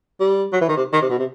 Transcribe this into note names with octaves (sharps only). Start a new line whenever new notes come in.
G3
F#3
E3
D#3
C3
D#3
C3
B2
C3